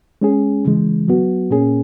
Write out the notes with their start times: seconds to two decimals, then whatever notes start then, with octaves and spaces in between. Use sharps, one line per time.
0.21 G#3 C#4 G#4
0.65 C#3 E3 G#3
1.08 F#3 B3 F#4
1.50 A#2 A#3 C#4 G#4